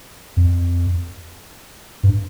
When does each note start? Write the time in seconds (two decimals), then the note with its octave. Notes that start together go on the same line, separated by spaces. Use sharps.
0.37 F2
2.03 G2